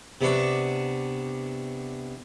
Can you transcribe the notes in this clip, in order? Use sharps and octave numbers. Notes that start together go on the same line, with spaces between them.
C3 B3 D4 C#6